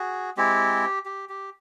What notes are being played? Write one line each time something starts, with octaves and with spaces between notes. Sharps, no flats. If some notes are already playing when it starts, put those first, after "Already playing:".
Already playing: F#4 G#4
G#3 C4 E4 G4
G4
G4